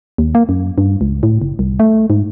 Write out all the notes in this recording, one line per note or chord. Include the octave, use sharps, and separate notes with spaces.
D#2
A#3
F#2
G2
C#2
A2
F#1
C2
A3
G#2